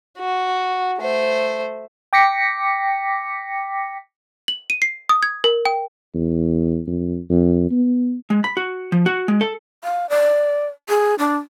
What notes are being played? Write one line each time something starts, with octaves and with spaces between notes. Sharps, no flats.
F#4
A3 C5
G5 D6 A#6 B6 C#7
F#7
D#7
C7
D#6
G#6
A#4
G5
E2
F2
F2
B3
G#3
B5
F#4
F3
F#4
G#3
A4
F5
D5
G#4
D4